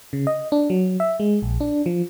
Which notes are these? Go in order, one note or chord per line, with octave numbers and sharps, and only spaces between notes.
C#3
D#5
D4
F#3
E5
G#3
A#1
D4
F3